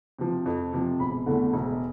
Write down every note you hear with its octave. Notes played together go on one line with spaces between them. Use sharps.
C3 F3
F2
C3 F3
E1 B5
E2 D3 A3
E1